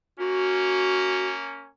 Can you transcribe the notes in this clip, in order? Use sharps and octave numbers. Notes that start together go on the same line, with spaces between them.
A#3 C#4 F#4